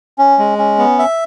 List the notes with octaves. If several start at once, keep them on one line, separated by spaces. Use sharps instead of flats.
C#4
G#3
C#4
B3
E5